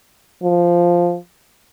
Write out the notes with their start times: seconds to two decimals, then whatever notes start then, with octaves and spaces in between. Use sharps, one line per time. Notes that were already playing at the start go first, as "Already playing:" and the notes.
0.42 F3